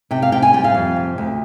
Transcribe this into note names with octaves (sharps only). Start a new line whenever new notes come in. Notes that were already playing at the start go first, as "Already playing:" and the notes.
C3 G5
F5
C3 G5
G#5
G3 G5
F5
F2
C3
D2